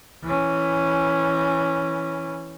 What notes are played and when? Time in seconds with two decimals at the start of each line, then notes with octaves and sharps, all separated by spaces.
0.24 E3 C#4